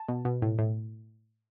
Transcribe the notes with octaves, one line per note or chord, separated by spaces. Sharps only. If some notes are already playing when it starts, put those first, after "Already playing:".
Already playing: A5
B2
B2
A2
A2